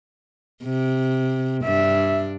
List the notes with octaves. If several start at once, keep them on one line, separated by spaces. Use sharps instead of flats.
C3
G2 D4 E5